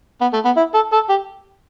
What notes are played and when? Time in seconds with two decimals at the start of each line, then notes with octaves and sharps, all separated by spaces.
0.21 B3
0.33 A3
0.45 B3
0.57 E4
0.74 A4
0.92 A4
1.09 G4